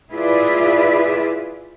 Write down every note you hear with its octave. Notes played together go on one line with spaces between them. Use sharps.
E4 F4 G#4 B4 D5 E5